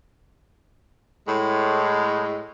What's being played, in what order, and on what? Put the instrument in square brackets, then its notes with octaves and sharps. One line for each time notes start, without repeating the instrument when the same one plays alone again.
[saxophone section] A2 G#3